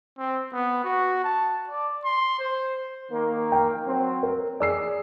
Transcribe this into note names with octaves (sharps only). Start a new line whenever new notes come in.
C4
B3
F#4
A5
D5
C6
C5
D#3 A#3
G5
F#3 C4
A#4
G#4 D5 E6 C7